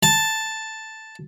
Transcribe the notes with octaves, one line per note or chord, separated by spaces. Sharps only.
A5